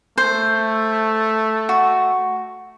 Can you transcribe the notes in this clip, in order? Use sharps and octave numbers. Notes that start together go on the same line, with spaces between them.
A3 C5
F#4